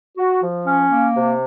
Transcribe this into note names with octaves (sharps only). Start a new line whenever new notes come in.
F#4
F3
C#4
A#3
C3